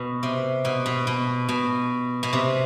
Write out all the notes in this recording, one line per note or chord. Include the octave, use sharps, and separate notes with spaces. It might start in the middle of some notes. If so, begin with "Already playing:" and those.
Already playing: B2
C3
B2
B2
B2
B2
B2
C3